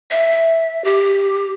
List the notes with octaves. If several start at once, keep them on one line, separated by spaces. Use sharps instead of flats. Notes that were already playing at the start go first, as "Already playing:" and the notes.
E5
G4